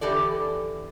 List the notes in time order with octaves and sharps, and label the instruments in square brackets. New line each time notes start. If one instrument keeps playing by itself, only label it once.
[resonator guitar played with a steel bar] D3 E3 G4 A4 D5